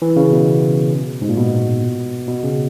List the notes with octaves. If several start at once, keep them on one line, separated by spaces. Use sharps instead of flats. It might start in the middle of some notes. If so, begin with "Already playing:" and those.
E3
C#3
B2
G#2
A#2
B2
B2
C#3